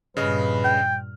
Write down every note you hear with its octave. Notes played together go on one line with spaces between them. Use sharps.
G2 A#2 C#3 B4 D#5 F6
G5